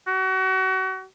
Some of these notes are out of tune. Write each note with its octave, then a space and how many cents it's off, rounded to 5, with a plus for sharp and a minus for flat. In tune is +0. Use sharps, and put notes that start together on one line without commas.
F#4 +30